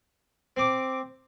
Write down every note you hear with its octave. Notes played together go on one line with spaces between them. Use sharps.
C4 D6